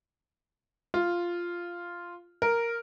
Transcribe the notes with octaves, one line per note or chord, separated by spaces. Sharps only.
F4
A#4